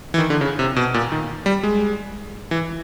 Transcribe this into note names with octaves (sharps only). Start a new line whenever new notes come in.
E3
D#3
D3
C#3
C3
B2
A#2
D#3
G3
G#3
E3